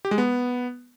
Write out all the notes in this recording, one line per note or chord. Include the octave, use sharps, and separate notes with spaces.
G4
G#3
B3